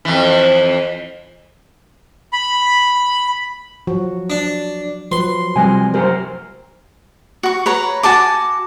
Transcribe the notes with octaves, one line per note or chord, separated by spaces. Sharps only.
F2 E3
B5
F3 F#3 F#4
D4
F3 F#3 B4 C6
C3 F3 G3 C5 D#5 G#5
F#2 G4 A#4 C5
F#4 C#6
B4 C#5 A#5
F#4 G#5 A5 D6